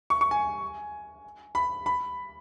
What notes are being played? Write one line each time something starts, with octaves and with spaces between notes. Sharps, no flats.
C#6
C#6
G#5
B5
B5